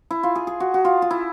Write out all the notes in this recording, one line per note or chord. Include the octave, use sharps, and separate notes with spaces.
E4
F4
G#4
G#4
F#4
F#4
F4
F4
E4